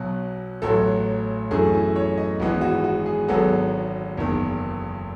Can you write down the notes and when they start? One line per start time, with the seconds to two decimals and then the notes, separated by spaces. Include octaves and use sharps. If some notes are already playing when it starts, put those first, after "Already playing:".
Already playing: B1 B2 F#3
0.62 A1 A2 F#3 A4
1.51 F#2 E3 A3 G#4
1.73 E4
1.96 C#5
2.18 D#5
2.40 G#1 G#2 E3 G#3 B3
2.61 F#4
2.84 F#4
3.06 G#4
3.28 G#1 G#2 F#3 B3 A4
4.17 F#1 E2 D#3